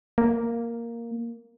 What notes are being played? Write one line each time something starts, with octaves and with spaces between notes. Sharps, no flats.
A#3